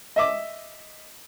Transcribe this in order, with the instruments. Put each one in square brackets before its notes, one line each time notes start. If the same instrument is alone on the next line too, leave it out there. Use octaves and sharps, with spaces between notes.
[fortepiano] D#5 E5 D6